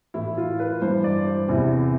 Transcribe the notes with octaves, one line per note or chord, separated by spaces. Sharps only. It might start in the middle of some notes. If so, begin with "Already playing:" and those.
A2 E3 E4
F4
B4
G2 E3 C5
D5
C5
E2 C3 E3